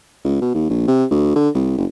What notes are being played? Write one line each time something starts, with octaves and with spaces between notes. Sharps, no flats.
C#2
B2
D#2
A#1
C3
D2
D3
C2
F#1